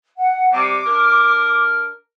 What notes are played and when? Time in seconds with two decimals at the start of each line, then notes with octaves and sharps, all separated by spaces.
0.16 F#5
0.52 C3 G3 D6
0.86 D4 A#4